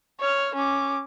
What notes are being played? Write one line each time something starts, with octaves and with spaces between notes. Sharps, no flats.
C#5 F6
C#4 D6